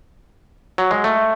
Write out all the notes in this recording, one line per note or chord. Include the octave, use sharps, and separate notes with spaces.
F#3
G#3
A3